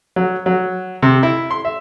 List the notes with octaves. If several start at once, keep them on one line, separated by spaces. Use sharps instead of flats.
F#3
F#3
C3
E4
C6
E5